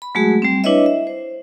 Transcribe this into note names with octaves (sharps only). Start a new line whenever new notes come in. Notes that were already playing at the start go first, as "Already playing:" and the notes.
B5
F#3 G#3 A3 F#4 G#4
G3 C4
D4 E4 B4 C#5 D#5 E5
E5
C5